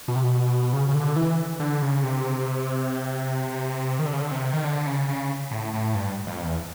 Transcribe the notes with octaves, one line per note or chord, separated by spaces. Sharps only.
B2
C3
B2
C#3
C#3
D3
E3
D3
C#3
C3
D#3
D3
C#3
D3
C3
D#3
D3
C#3
C#3
A2
A2
G2
F2
E2